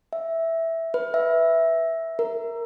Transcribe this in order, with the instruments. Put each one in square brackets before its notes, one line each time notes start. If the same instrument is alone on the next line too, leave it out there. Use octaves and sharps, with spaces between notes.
[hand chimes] E5
B4
E5
A#4